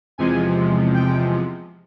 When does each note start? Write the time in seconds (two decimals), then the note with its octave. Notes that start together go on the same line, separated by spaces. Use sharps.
0.18 E2 C3 F3 G#3 G#5
0.94 G5